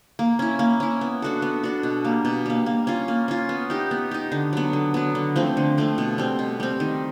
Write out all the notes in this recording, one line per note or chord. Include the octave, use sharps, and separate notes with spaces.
A#3
C#4 E4
A#3
C#4 E4
B3
D4 F#4 A4
B3
D4 F#4 A4
B2
G3 A#3
B2
G3 A#3
A#3
C#4 F4
A#3
C#4 F4
B3
D#4 G4
B3
D#4 G4
D3
F#3 B3
D3
F#3 B3
D3
F3 A3 C4
D3
F3 A3 C4
B2
G3 C4
B2
G3 C4
D#3